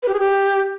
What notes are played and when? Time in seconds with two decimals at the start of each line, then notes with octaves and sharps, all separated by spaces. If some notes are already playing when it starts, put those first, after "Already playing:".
0.03 B4
0.08 G4
0.14 G#4
0.19 G4